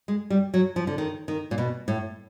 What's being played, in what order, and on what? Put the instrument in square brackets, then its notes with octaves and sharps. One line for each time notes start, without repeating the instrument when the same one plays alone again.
[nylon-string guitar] G#3
G3
F#3
F3
D3
D#3
D#3
A#2
B2
A2